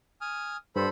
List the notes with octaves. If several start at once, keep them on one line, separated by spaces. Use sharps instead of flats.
G#5 D#6 F6
G2 A4 C5 B5